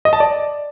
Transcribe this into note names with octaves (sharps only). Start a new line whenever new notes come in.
D#5
A5
D5